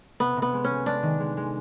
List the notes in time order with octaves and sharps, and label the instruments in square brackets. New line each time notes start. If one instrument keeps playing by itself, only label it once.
[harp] C3 [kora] B3
[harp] C3
[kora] B3
[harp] G#3
[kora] C#4
[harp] G#3
[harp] G#3 [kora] D4
[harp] D#3
G#3
G#3